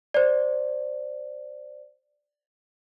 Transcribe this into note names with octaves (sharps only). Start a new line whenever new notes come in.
C5 D5